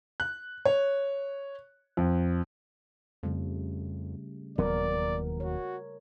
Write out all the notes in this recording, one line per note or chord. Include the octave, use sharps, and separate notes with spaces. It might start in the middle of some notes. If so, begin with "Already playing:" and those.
F#6
C#5
F2
F2 C#3 G3 A3
E1 D#2 F#3 B3 A#4 D5
F#4 C#5